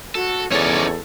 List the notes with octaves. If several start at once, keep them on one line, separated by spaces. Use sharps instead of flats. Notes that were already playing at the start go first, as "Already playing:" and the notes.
F#4 A4
E2 C#4 D#4 A4 C#5 D5